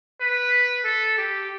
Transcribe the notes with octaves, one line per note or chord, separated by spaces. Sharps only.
B4
A4
G4